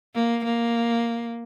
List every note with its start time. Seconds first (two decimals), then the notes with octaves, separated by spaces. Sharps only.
0.15 A#3
0.45 A#3